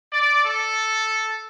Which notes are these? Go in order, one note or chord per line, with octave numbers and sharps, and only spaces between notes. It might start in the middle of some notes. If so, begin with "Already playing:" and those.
D5
A4